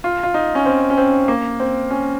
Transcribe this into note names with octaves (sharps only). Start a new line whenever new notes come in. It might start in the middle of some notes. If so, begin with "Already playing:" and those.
F4
F4
D#4
C#4
C4
C#4
C4
A#3
C4
C#4